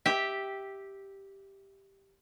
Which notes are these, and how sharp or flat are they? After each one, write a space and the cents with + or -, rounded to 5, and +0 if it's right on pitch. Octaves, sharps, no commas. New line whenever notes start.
G4 +0 E5 -10